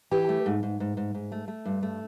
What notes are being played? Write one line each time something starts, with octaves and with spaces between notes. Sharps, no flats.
E3 G4
A3
G#2
G#2
G#2
G#2
G#2
A3
A3
G2
A3